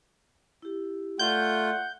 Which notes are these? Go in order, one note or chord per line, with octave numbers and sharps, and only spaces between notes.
E4 G4
A3 F4 D5 E5 F#5 C6 G6